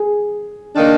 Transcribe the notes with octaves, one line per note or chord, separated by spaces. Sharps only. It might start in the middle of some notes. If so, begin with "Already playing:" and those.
Already playing: G#4
D#3 A#3 D4